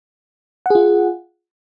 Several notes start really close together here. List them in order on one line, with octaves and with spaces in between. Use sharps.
F#5 G#4 F4